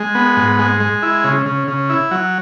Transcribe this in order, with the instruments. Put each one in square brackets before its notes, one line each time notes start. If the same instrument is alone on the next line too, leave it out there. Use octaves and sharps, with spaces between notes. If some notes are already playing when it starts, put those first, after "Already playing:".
Already playing: [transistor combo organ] G#3
B3
G#2
G#3
G#3
E4
C#3
C#3
C#3
E4
F#3